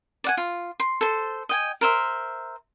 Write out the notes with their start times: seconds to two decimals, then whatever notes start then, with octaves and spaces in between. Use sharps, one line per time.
0.24 D5 F#5 G#5
0.37 F4
0.80 C6
1.01 A4 C5
1.49 D#5 G5 G#5
1.81 A#4 C5 E5